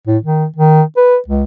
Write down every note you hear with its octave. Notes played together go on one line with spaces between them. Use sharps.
A2
D#3
D#3
B4
C#2